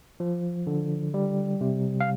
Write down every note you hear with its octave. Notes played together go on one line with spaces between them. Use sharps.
F3
D3
G3
C3
F5